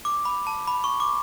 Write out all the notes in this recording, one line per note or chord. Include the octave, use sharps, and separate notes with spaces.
D6
B5
A5
B5
C#6
D6